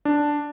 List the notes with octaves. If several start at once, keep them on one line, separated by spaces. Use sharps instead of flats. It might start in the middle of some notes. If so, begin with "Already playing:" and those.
D4